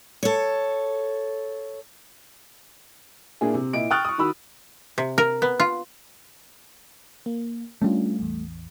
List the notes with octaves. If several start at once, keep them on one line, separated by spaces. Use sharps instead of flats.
A4 C#5
A#2 A#3 D4 E4 G#4
C3
A#2 E4 D#5 D7
G5 C#6 D#6 F6 F#6 A6
C#6 D#6
D#3 F#4 B5 E6
C3
A#4
B3
F4
A#3
G3 A3 C#4 D4 F4
A1 E2